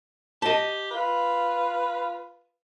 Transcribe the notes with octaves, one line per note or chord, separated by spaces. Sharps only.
G4 D#5 A5
F4 B4